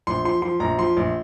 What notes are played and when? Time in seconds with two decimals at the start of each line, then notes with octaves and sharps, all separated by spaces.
0.07 A#1 C6
0.25 F3 C6
0.42 F3 C6
0.60 A#1 A#5
0.78 F3 C6
0.97 A#1